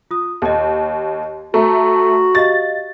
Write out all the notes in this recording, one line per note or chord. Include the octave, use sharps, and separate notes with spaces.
F4 D#6
D#2 D#5 G5
A3 F#4 A#5
G4 D#5 F5 A6